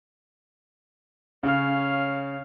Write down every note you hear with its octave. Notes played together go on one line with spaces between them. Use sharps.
C#3 C#4 F5